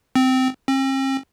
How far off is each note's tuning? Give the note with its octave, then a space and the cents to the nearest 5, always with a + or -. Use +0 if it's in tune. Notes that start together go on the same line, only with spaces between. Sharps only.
C4 -15
C4 +45